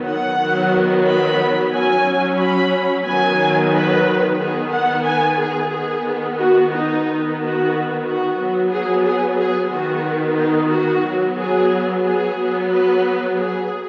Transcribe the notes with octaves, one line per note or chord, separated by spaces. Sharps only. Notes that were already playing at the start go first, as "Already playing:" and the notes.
Already playing: D#3 F#3 B3
F#5
D#3 F#3 B3
B5
F#3 C#4 G#5
B5
D#3 F#3 B3 G#5
B4
D#3 B3 G#4
F#5
G#5
G#4
D#3 B3 G#4
F#4
D#4
D#3 B3
F#4
F#4
F#3 B3
G#4
G#4
G#4
D#3 B3 F#4
D#4
F#4
F#3
B3
G#4
G#4
F#3 B3
B4
G#4